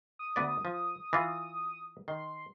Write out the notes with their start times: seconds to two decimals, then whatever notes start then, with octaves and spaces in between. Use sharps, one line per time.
0.19 D#6
0.36 D2 B3 D5
0.65 F3
1.13 E3 F4
2.08 D#3 C6